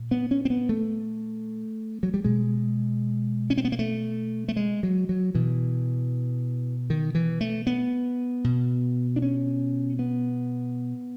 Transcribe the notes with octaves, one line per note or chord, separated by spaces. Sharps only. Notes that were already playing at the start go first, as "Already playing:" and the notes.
Already playing: A#2
B3
C#4
C4
B3
A3
F#3
G3
B2 G#3
C#4
C4
B3
A#3
A3
A3
G#3
F#3
F#3
B2 E3
D#3
E3
A3
B3
B2
D4
C#4
B3